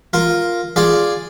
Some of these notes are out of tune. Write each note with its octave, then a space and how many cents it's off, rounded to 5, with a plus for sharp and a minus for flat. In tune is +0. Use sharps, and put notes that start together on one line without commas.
F4 +0 A#4 +0
F4 +0 G#4 +0 D5 +0